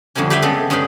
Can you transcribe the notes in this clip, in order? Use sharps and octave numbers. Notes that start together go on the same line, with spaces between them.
F2 D3 G3 A3 C#4
G4 B4 E5 F5 G5 G#5
C#3 G#3 B3 A4
G2 G#3 C#4 G#4 B4 G5